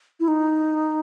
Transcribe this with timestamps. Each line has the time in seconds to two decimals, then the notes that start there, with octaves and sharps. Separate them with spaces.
0.20 E4
0.28 D#4